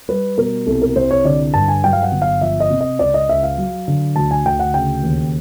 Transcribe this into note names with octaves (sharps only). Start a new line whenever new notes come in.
G3 B4
B2 A#4
C2 A4
A#4
C2 C5
C#5
D3 D5
G2 A5
G#5
F#3 G5
F5
F#5
G1
F5
F3 E5
D#5
C3
D#5
C#2 D5
D#5
C#2 E5
F5
F#3
D3
D2 A5
G#5
D2 G5
F#5
C#3 G5
D#2